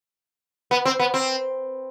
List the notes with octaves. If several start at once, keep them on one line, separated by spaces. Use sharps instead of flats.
B3
C4
B3
C4